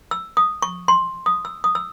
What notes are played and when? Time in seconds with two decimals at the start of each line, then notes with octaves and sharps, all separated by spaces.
0.11 E6
0.37 D#6
0.62 C#6
0.88 C6
1.26 D#6
1.45 E6
1.64 D#6
1.75 E6